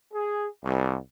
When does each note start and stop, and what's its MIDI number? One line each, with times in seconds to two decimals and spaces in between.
0.13 0.46 68
0.64 0.97 36